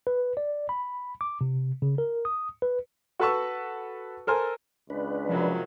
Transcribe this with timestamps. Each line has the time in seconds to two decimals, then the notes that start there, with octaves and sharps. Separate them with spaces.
0.07 B4
0.37 D5
0.69 B5
1.21 D6
1.41 C3
1.82 C#3
1.98 A#4
2.25 D#6
2.62 B4
3.20 F#4 A4 B4 A5 C#6 E6
4.27 A4 A#4 C5 G#5
4.90 C#2 D4 B4
5.29 C3 D#3 F3 F#3